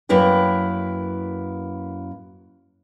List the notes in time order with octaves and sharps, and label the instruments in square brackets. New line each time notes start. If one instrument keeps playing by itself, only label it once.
[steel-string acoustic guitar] F#2 A#3 E4 B4 G5